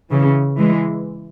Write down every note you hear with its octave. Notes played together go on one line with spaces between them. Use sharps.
C#3 E3
E3 G#3